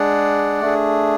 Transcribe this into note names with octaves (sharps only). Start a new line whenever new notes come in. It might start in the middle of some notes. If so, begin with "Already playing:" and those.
Already playing: G#3 D4 G#4 D5 F#5
A3 D4 G#4